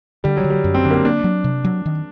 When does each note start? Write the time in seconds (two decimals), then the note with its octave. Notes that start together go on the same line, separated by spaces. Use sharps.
0.24 D3 G3
0.37 F#3
0.44 D3
0.50 G3
0.64 F#2
0.74 C4
0.85 D3 D4
0.91 A#3
0.94 C4
1.05 A#3 D4
1.24 F#3
1.44 C3
1.64 F#3
1.86 D#3